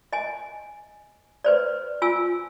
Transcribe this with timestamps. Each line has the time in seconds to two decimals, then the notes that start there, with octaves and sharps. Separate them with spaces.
0.13 D#5 G#5
1.44 B4 C5 D5
2.02 F4 G#5 E6